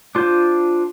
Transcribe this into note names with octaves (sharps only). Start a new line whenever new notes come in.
D4 F4 C5 G6